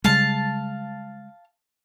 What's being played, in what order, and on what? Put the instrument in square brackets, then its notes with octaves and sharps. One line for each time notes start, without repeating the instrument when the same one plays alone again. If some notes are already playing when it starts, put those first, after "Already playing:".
[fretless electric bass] C#3 G3 G#3 [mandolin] F5 A5